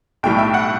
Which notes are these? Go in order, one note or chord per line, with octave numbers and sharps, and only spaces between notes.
B1 A2 G3 G5
E5
F#5